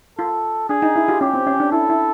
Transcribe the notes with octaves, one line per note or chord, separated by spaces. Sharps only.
F4 A4
D4 G#4
D#4
E4
F4 G4
C#4 G4
C4
C#4
D4
E4 A4
E4